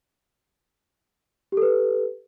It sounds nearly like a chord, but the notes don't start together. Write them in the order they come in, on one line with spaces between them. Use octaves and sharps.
G4 A4 B4